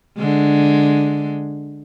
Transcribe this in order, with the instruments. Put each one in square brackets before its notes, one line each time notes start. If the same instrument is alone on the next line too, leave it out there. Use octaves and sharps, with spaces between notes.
[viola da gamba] D3 G#3